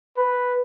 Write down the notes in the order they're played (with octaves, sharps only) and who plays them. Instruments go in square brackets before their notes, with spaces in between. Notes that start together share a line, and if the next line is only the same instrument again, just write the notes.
[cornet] B4